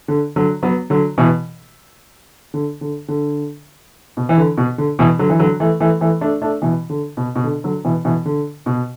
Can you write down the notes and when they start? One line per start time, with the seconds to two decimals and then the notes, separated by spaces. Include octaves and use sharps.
0.08 D3
0.36 D3 F#3
0.63 F#3 B3
0.90 D3 F#3
1.18 B2 E3
2.54 D3
2.81 D3
3.08 D3
4.17 B2
4.29 E3
4.38 D3
4.57 B2
4.78 D3
4.99 B2 E3
5.19 D3 F#3
5.29 E3
5.39 D3 F#3
5.60 E3 A3
5.80 E3 A3
6.01 E3 A3
6.21 A3 D4
6.42 A3 D4
6.62 B2 E3
6.90 D3
7.17 B2
7.35 B2
7.44 D3
7.64 D3 F#3
7.84 B2 E3
8.05 B2 E3
8.25 D3
8.66 B2